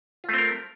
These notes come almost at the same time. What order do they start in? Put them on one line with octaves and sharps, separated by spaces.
F4 A3 C4 A#4